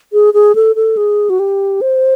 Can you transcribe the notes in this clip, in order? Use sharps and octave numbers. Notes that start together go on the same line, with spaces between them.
G#4
G#4
A4
A4
G#4
F#4
G4
C5